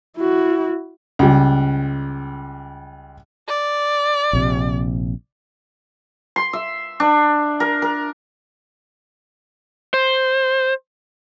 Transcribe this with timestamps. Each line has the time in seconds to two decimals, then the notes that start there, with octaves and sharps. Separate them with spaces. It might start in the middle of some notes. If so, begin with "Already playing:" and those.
0.17 E4 F#4
1.19 C#2 G3
3.48 D5
4.33 A#1 C3
6.36 C6
6.53 E5
7.00 D4
7.60 A#4
7.82 A#4
9.94 C5